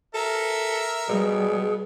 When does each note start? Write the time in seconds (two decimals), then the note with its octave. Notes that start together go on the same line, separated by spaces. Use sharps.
0.14 A4 A#4 E5
1.08 B2 G3 G#4